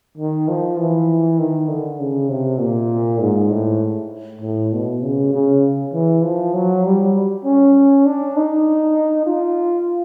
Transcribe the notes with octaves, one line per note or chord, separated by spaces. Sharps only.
D#3
F3
E3
D#3
D3
C#3
C3
A#2
G#2
A2
A2
B2
C#3
C#3
E3
F3
F#3
G3
C#4
D4
D#4
F4